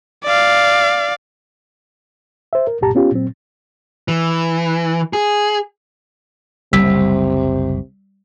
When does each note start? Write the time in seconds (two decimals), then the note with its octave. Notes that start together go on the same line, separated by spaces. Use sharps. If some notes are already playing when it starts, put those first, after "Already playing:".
0.25 D5 F5
2.53 C5 E5
2.67 A#4
2.81 C2 F#2 A#2 G4 A5 A#5
2.95 B3 C#4 F4 G4
3.12 A#2 F#3 C4
4.08 E3
5.13 G#4
6.73 F#1 C2 C3 G3 E6 B6